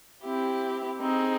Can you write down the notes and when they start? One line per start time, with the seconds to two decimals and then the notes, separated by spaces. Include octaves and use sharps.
0.23 C4 E4 G4
1.00 C4 D#4 G#4